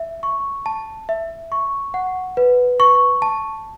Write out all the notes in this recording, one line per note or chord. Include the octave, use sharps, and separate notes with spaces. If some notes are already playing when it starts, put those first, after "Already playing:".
Already playing: E5
C#6
A5
E5
C#6
F#5
B4
C#6
A5